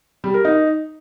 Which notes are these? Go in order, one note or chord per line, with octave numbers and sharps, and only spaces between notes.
G3
A#4
D#4